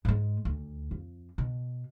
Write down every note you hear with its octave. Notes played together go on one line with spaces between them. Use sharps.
G#2 G#3
D2
F2
B2